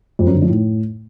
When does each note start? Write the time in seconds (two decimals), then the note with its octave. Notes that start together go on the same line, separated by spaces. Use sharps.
0.19 F2
0.27 F#2
0.34 D3
0.42 F3
0.49 A2